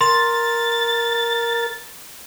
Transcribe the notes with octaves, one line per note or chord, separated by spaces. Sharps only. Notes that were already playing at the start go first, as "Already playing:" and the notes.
A#4 C6 A6